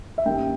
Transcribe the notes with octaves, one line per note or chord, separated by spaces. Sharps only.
E5
G2 D#3 G3 A#3 C#4 G5